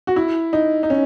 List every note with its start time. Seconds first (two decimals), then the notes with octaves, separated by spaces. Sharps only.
0.07 F#4
0.16 E4
0.53 D#4
0.83 D#4
0.90 C#4